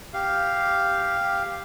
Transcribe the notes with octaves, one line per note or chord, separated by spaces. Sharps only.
G4 F5